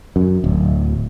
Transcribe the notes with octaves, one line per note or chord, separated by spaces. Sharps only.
F#2
D1